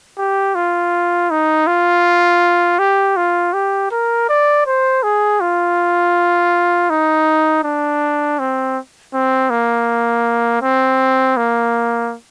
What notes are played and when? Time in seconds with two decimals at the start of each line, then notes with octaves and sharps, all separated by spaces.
0.18 G4
0.55 F4
1.31 D#4
1.67 F4
2.79 G4
3.17 F4
3.54 G4
3.92 A#4
4.29 D5
4.67 C5
5.03 G#4
5.40 F4
6.90 D#4
7.64 D4
8.39 C4
9.14 C4
9.50 A#3
10.62 C4
11.37 A#3